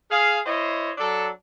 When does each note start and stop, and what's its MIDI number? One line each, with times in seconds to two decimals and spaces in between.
0.10 0.39 68
0.10 0.39 77
0.46 0.92 64
0.46 0.92 72
0.46 0.92 73
0.46 0.92 75
0.98 1.28 54
0.98 1.28 62
0.98 1.28 69